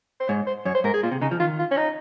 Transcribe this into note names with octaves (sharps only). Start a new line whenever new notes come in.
C5
G#2 C#5
C5
F#2 C#5
C5
G#2 A#4
G#4
A#2 F4
C3
C#3 D#4
F3
D#3 F4
F4
C#4
D#4